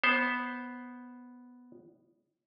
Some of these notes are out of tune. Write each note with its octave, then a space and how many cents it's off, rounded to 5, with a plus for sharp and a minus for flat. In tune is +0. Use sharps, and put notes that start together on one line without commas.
B3 +0 C5 +10